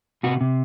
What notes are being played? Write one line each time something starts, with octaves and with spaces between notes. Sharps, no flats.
C3 F#4
C3